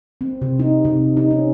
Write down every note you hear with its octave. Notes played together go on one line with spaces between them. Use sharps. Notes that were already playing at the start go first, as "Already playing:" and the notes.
C4
C3
D#4
C3
D#4
C#4